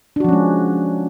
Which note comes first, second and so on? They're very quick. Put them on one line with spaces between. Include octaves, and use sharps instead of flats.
D4 F#4 F3 C#4 G#3